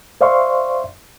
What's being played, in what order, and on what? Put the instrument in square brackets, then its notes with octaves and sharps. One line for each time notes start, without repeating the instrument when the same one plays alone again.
[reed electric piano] C5 D5 E5 F5 C6 C#6